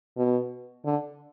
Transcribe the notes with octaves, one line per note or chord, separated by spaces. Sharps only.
B2
D3